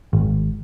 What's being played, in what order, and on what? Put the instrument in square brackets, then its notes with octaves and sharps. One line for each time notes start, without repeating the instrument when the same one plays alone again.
[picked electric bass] G#1